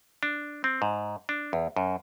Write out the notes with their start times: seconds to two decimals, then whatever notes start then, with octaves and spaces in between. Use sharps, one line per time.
0.23 D4
0.64 C4
0.82 G#2
1.29 D4
1.53 E2
1.77 F#2